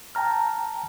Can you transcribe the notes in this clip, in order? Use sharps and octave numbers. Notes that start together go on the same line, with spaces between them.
G5 A5 A#5 F6